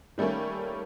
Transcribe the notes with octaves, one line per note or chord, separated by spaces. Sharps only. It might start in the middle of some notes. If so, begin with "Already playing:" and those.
D#3 G3 A3 A#3 C#4